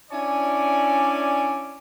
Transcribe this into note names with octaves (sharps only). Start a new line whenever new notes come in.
C#4 D4 E4 C#5 D5 G#5